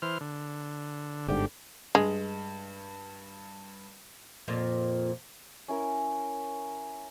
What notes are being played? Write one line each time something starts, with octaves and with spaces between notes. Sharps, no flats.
E3 C5 F6
D3
G1 G#2 D3 G4
G2 G#3
F2 A#2 F4
C#4 E4 A#4